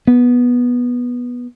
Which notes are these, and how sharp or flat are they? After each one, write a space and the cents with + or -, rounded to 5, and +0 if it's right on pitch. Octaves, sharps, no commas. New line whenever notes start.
B3 -10